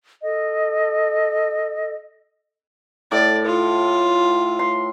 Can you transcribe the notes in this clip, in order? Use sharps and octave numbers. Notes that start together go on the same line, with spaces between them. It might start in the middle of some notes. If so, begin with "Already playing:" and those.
A4 D#5
A2 D5
F4
C6